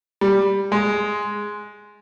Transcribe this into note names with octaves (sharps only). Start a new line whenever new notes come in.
G3
G#3